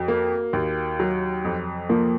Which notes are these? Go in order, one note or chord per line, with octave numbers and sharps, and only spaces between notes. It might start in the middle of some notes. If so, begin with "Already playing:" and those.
Already playing: F2 F#4
A#3
D#2
F#3
F2
F3 A#3